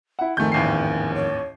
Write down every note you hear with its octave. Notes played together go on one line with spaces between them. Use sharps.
E4 F#5
F2 G#2 D#3 A3 G#5 G6
A1 D#2 C7
C#5